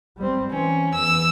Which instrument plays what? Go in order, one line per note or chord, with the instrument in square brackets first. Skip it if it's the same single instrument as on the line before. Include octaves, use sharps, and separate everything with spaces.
[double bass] G3 C4
[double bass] E3 [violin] C#4
[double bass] E2 E3 [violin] E6